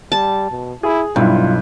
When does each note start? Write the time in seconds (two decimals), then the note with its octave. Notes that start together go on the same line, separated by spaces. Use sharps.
0.12 G3 A5
0.51 B2
0.83 E4 G#4
1.16 B1 G2 E4 F4